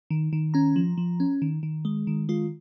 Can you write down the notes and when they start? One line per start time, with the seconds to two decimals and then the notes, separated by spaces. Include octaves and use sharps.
0.10 D#3
0.33 D#3
0.54 C#4 A#5
0.76 F3
0.98 F3
1.20 C#4
1.42 D#3
1.63 D#3
1.85 G#3
2.07 D#3
2.29 G#3 F4